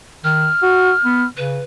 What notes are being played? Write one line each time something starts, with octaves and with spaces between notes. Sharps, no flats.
D#3 F6
F#4
B3
C#3 B4